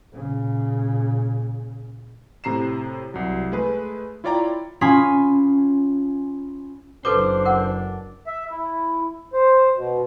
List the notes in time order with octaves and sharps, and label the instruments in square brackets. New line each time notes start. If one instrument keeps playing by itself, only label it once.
[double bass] A#2 C#3
[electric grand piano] A2 C3 A#5 C7 E7
C2 F#3
G#3 A3 G#4 B4
E4 F4 C#5 D5 G5 A#5
[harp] C#4 F4 G#5 B5 D#6
[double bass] F#1 D4 [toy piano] A4 B4 D6 [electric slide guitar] C5
[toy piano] A#4 F#5
[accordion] E5
E4
C5
B2